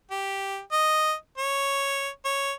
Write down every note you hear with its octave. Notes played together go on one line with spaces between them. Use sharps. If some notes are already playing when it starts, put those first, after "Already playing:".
G4
D#5
C#5
C#5